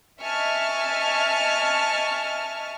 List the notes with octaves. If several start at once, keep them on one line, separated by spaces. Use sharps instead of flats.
D#5 E5 G#5 A5 C#6 F6